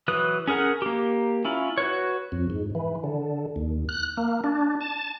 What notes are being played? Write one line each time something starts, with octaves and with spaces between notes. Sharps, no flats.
E3 F#3 B4 D#6 F#6
C#4 G#4 A#4 F#5
A#3 G4
C#4 E4 F4
F#4 B4 C#5
F2
G#2
E3
D3
D#2
F#6
A#3
D4
A5